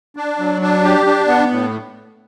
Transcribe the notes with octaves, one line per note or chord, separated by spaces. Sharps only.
D4
F#3
D4
G4
D4
B3
A2